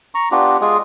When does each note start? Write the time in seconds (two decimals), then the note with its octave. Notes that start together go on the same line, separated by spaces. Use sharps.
0.15 A#5 C#6
0.31 B3 D4 F4 G4
0.61 G#3 F4 G#4